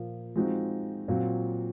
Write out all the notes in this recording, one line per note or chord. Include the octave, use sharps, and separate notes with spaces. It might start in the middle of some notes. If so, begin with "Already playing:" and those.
Already playing: A#2 F3 A#3
F3 G#3 C4 D#4 F#4
A#2 F#3 C4 F#4